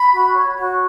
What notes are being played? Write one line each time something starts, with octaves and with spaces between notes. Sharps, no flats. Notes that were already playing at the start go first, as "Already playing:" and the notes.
Already playing: B5
F#4
C#5
F#4